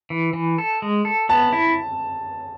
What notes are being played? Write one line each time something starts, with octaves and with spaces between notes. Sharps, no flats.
E3
E3
A4
G#3
A4
B3 A5
E4